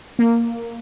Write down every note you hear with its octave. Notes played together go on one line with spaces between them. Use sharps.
A#3